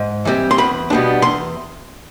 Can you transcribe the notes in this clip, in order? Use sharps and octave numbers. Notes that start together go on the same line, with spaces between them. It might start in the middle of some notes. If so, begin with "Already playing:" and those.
Already playing: G#2
E3 G3 C4
C6
E2 B5
B2 G3 B3 D4
E2 C6